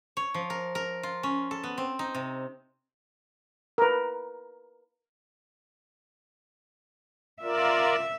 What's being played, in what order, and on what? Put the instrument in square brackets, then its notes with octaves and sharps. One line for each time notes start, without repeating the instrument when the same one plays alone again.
[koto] C#5
F3
A#4
A#4
F4
C#4
A4
B3
C4
D#4
C3
[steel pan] A#4 B4
[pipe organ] F4 A#4 D5 [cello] E5